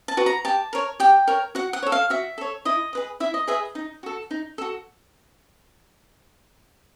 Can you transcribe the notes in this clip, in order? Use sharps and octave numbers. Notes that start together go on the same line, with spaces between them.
A5
F#4 B4
A#5
G4 A5
A#4 C#5
G4 G5
A#4 C#5
F#4 F#5
F#5
A4 C#5
F5
F#4 E5
A4 C#5
E4 D#5
G#4 B4 D#5
E4 E5
D#5
G#4 B4 D#5 E5
D#4
F#4 A4
D#4
F#4 A4